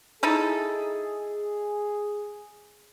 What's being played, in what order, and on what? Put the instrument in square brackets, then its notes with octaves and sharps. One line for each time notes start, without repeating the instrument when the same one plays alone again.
[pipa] D#4 E4 A4 [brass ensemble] G#4